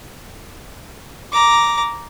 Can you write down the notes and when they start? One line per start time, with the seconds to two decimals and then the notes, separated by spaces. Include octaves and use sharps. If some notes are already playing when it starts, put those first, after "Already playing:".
1.32 A#5 D6